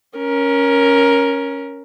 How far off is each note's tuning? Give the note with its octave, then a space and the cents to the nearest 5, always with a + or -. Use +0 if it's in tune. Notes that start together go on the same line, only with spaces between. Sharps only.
C#4 +0 A#4 +10